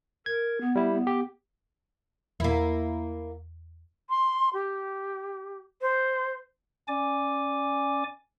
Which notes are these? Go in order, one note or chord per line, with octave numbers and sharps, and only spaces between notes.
A#4 G#6
B3
G3 E4
B3
G4
E2 A#3 E4
C6
G4
C5
C#4 D5 G#5 D6